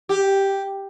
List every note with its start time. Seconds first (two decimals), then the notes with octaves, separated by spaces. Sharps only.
0.09 G4